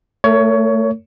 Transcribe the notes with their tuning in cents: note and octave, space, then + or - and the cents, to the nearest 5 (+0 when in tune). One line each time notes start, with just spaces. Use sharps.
A3 +15 A#4 -25 C#5 +20